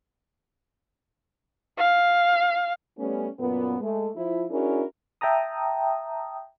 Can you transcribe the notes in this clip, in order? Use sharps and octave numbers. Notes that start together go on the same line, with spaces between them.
F5
G3 A3 B3 C#4
F#2 A#2 A#3 B3
G#3 A3
F3 E4
C#4 D4 E4 F#4 G#4 A#4
E5 G5 A5 A#5 D#6